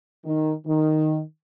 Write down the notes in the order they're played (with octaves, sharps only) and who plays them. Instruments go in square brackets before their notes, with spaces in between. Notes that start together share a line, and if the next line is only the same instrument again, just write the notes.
[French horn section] D#3
D#3